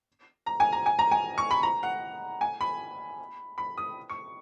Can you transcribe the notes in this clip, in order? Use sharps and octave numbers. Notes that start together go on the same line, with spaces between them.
A#5
G#5
A#5
G#5
A#5
G#5
C#6
B5
A#5
F#5
G#5
B5
B5
D#6
C#6